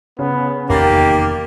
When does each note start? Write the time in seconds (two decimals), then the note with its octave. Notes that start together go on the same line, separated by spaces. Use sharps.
0.19 C#3 B3
0.70 F1 E2 D#3 A#3 B3 G4 F5 A6